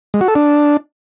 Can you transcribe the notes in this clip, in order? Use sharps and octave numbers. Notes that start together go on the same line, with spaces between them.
G#3
F#4
A4
D4